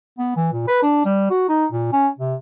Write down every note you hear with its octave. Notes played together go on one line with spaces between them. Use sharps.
B3
E3
A#2
B4
D4
G3
F#4
D#4
A#2
C#4
C3